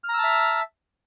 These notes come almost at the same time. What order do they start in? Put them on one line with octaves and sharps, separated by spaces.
F6 A#5 E6 A5 E5